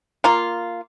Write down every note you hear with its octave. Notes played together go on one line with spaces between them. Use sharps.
A#3 F4